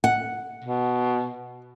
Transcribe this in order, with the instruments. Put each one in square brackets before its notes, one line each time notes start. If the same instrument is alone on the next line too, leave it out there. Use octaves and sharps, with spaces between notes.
[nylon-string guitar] F#5
[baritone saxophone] B2